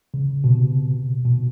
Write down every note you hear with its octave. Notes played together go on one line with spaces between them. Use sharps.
C#3
B2
C3
B2